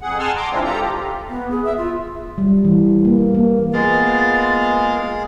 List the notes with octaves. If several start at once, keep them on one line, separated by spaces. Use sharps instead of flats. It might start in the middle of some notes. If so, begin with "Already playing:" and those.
F2 G#4 F#5
F#5 G#5 A5 C6 E6 F6
A#5 C6 D6
E3 G#3 C4 D4 E4 F4
F4 G4 A4 A#5
G4
B3
G#4
E5
F4
G3
E3
A#3
A#3
G#3 A#3 B3 F4 G#4 A6